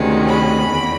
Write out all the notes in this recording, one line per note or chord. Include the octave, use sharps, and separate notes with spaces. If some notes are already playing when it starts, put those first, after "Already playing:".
Already playing: D2 C3 D#3 G#3 C#4
B5
E2